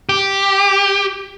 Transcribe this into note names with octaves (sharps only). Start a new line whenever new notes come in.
G4